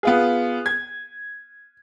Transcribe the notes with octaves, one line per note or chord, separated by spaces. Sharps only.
B3 F4 G#4
G#6